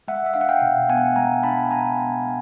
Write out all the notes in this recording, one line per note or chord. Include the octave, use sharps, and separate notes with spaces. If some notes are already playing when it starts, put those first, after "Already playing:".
G#3 E5 F#5
E5
D4 F5
F#5
F5 G5
B2
B3 F#5 G#5
G#3 G#5 A#5
D4 A5 B5
B2 G#5 A#5
B3
G#3